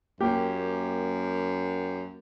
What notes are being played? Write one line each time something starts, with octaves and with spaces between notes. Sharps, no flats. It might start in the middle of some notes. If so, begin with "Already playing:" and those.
F#2 A#3 G4